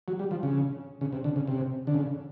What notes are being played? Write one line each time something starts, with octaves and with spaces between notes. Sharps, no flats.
F#3
G3
F3
C#3
C#3
C3
D3
C#3
C3
D3
C#3